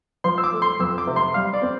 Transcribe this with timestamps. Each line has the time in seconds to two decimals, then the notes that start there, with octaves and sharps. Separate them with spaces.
0.24 F3 C6
0.38 E6
0.44 D6
0.52 A3
0.62 C6
0.79 F2 E6
0.98 D6
1.07 C3
1.16 C6
1.34 G3 F5
1.53 D5
1.62 C4